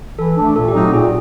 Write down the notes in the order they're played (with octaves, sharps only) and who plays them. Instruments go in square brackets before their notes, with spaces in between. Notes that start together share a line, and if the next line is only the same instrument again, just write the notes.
[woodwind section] E3 [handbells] A4
[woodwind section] A3 D4
[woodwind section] A#2 [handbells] A4
[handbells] G4
[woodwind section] F#3 A3 C4 D#4
[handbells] F#4
[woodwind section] A#2 [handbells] G#4